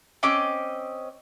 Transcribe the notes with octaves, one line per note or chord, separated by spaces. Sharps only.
C4 C#4 D#5 D6